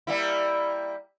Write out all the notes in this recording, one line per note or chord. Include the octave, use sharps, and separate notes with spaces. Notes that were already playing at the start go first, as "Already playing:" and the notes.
G3 A#3 E4